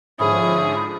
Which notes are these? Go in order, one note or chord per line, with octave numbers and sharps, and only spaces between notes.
G#2 D3 F3 C#4 E4 G#4 D#6